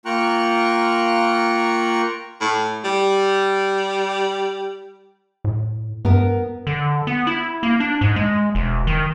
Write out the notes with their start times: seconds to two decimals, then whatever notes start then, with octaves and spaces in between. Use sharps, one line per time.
0.05 A#3 F4 G5 A#5 C#6 F#6
2.41 A2
2.85 G3
5.44 A2
6.05 G2 B3 A#4
6.67 D3
7.07 B3
7.27 E4
7.63 A#3
7.80 D4
8.01 G#2
8.16 G#3
8.55 E1
8.87 D#3